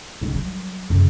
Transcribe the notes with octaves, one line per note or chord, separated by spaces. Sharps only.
C#2 G#2
F#3 G3
F#2 C#3